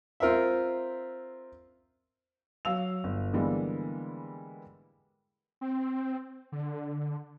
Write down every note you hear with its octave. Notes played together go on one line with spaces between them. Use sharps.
C4 F4 A#4 C5 E5
F#3 F5 E6 F7
G1
D3 E3 G3 G#3 A#3 B3
C4
D3